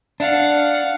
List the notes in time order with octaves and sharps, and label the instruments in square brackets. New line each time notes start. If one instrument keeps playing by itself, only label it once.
[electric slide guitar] D4 [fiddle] F5 F#5